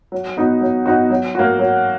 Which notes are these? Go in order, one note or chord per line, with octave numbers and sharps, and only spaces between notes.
F#3
B3 D#4 F#4
F#3
B3 D#4 F#4
F#3
A#3 C#4 F#4
F#3